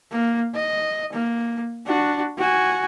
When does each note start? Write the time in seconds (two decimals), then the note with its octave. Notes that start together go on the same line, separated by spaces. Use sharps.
0.12 A#3
0.55 D#5
1.13 A#3
1.86 D4 F#4
2.38 F#4 G#5